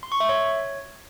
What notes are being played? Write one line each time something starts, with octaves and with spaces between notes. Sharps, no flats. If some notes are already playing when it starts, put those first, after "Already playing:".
C6
C#6
E5
C#5